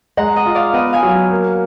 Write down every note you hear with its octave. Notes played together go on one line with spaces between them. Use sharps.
G#3 F#5 A#5
D#5 F#5
F4
D5 F5
B3 D#5 F#5
F5 G#5
F#3
A#3